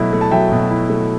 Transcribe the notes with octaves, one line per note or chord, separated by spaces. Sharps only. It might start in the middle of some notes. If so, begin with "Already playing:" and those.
Already playing: B2 F#3 A3 E4
A3
A5
F#3 E5 G5
B2
E4
A3